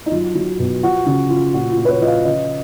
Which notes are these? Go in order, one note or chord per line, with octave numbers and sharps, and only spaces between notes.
D#4
F#3 F4
F#3
B2
F3 F#4
C#3 F#4
F3 F4
A#2 F#4
F4
A#2
B4
C#5
F3 D#5
F5
C#3 D#5